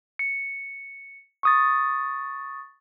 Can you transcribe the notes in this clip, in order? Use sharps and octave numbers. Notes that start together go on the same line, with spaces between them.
C#7
C#6 D#6 A6